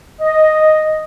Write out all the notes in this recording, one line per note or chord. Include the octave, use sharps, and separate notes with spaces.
D#5